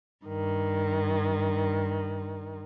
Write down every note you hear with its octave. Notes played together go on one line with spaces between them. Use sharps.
G2 D#3